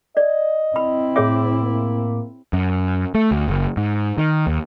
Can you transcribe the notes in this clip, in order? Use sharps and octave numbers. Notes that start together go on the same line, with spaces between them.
D5 D#5
C4 E4 B5
A2 G#4 C#5 E5 D6
A#3
F#2
A3
D2
F#1
G#2
D#3
D#2